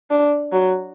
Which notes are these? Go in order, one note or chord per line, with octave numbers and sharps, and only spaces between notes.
D4
F#3